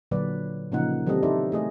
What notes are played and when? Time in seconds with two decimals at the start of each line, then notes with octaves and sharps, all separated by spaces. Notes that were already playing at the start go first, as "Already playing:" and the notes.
0.11 A#2 D3 F#3 B4 D5
0.72 A#2 C#3 F3 A#3 D#4 F#5
1.07 E3 G3 C4 A4 D#5
1.23 D#4 E4 A4 C5 D5
1.52 A3 G#4 D#5